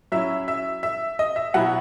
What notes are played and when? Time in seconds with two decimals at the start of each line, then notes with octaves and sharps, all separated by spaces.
0.12 F#3 C#4 E4 E5
0.48 E5
0.83 E5
1.19 D#5
1.36 E5
1.54 B2 F#3 B3 E4 F#5